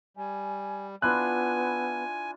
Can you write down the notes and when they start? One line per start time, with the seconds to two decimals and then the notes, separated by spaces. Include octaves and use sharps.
0.17 G3 G#5
1.02 B3 D4 E4 F4 G#5 F#6